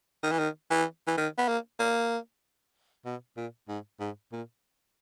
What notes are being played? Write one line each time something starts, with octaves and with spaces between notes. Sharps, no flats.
D#3
E3
D#3
E3
E3
D#3
B3
A#3
A#3
B2
A#2
G#2
G#2
A#2